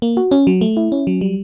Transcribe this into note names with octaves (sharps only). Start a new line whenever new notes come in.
A#3
F#4
C#4
F#3
A3
E4
C#4
F#3
G3